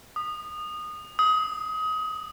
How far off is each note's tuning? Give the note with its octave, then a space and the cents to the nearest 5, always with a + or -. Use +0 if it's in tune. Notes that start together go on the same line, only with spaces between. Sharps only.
D#6 -25
D#6 +25